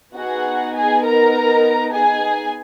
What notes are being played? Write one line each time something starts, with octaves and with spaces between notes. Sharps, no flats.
B3 D#4 F#4 G#4 F#5
G#4 G#5
A#4 A#5
G#4 G#5